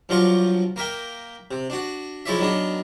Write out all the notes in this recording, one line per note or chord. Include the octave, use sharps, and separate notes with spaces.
G2 F3 F#3 F4 C#6 D6
A#3 A#4 E5 G5
C3
D4 F#4
F3 G#3 E4 C#5 D5 E5
D#3 F#3 B3 D4